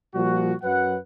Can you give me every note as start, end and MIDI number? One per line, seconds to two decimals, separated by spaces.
0.15 0.54 46
0.15 0.54 53
0.15 0.54 55
0.15 0.54 66
0.63 0.97 42
0.63 0.97 54
0.63 0.97 71
0.63 0.97 78